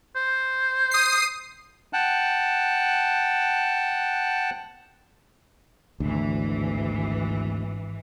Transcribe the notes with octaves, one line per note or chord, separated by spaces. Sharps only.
C5
D#6 C7
F#5 G5 A5 F#6
G#1 D2 E3